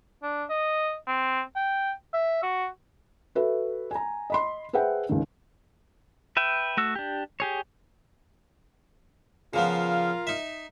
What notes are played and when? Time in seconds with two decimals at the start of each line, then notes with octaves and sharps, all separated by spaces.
0.22 D4
0.50 D#5
1.07 C4
1.56 G5
2.14 E5
2.43 F#4
3.35 F#4 A4 B4 E5
3.91 G#5 A#5
4.30 D#5 B5 C6
4.73 G#4 B4 C5 E5 F#5 G5
5.09 C#2 D#3
6.37 B4 E5 G5
6.77 A3 F#4 E6
6.95 D4 G4
7.40 G4 G#4 C#5
9.54 C#3 F3 B3 F4 A#4 F5
10.27 D#4 E5